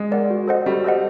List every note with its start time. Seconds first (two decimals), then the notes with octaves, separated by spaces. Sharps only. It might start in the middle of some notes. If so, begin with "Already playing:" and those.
Already playing: G#3
0.12 A#4 D5 F#5
0.30 F#4
0.48 A4 C5 D#5 F#5
0.66 G3 F#4
0.84 A4 C5 D#5 F#5